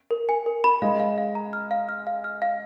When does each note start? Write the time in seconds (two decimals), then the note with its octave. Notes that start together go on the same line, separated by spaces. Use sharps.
0.11 A#4
0.29 G#5
0.46 A#4
0.64 B5
0.82 G#3 F5
1.00 F5
1.18 F5
1.35 A#5
1.53 F6
1.71 F5
1.89 F6
2.07 F5
2.24 F6
2.42 F5